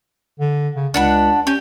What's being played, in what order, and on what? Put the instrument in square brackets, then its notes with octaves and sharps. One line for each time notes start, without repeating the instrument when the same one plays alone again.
[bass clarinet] D3
C#3
[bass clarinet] C#2 [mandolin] D4 F#5 B5
[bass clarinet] C#4 [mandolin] G4